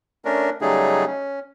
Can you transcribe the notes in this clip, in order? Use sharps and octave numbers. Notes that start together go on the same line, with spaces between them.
A3 C#4 D4 A#4
C#3 F#3 G3 A3 D#4 G#4
C#4